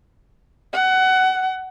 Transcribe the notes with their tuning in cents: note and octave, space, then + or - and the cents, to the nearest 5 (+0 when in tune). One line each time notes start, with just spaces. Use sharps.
F#5 +20